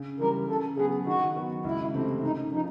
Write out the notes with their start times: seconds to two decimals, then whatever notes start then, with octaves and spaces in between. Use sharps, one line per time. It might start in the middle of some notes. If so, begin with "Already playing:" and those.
Already playing: C#3
0.19 E3 G3 A#4
0.48 C#3 A4
0.77 F#3 B3 G#4
1.06 D#3 F#4
1.36 F#3 B3
1.64 C#2 E4
1.94 C3 E3 A3 C4
2.23 F#2 D#4
2.52 C#3 F3 D#4